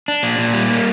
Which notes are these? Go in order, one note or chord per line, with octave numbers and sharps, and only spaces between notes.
D4
A#2
A#2
G3
A#3